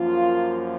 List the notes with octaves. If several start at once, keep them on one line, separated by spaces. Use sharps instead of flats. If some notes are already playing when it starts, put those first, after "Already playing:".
Already playing: F#2 F3 A#3 F4